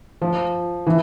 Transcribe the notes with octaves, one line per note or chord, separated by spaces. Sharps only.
F3
E3